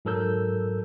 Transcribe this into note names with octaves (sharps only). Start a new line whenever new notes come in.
G#2 F#3 A4 A#4 E6 G6